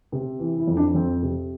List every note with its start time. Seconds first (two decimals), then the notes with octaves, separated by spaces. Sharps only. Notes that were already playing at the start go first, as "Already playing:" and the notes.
0.12 C3
0.40 E3
0.59 E4
0.67 F2
0.77 D4
0.95 F2 C4
1.23 C3